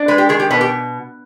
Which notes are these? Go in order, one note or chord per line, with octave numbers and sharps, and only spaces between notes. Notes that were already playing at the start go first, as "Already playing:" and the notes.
Already playing: D4
G#3 B4
G4
D#3 G#4
G4
B2 B4
G4